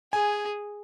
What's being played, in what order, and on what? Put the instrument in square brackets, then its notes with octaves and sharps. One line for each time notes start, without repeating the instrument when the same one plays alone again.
[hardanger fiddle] G#4 [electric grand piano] G#5